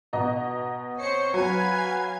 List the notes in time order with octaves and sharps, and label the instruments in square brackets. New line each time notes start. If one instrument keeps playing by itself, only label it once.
[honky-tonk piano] B2 D#5 A#5
[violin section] C4 C5 C#7 [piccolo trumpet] C#5
[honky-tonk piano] F#3 [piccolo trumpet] B4 [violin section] F5 G#5 G#6